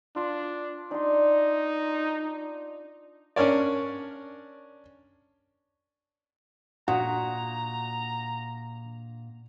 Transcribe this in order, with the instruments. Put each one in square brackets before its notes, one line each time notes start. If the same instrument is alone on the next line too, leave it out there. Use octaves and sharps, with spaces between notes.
[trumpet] D4 [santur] F4
[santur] D4 C6 [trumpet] D#4
[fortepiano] C#4 D4 A#4 C#5 D5
[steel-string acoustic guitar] A#2 [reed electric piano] D4 D#6 F#6 [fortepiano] F#4 [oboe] A#5